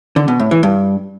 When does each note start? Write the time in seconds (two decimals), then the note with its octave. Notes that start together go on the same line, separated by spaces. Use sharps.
0.16 D3
0.28 B2
0.40 A2
0.51 E3
0.63 G2